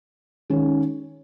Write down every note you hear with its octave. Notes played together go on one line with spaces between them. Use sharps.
D#3 G#3 C#4